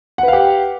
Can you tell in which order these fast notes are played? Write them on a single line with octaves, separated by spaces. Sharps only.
F#5 B4 F5 G4